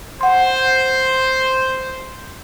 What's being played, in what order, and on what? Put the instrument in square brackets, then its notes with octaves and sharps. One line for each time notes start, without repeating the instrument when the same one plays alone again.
[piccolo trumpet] C5 [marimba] F#5 C6